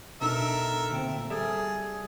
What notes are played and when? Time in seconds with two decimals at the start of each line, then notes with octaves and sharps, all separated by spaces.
0.21 B2 D4 D#4 A4 A#4 E5
0.90 D2 A#2 C4
1.30 G3 G#4 A4 E5